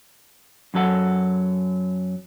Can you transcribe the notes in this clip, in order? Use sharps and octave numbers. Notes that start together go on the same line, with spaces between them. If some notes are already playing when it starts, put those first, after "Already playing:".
F#2 F#3 A4 F#5